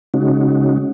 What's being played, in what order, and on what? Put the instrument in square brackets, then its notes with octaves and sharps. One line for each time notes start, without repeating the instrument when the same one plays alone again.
[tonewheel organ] C#3 G#3 C#4 D#4 F#4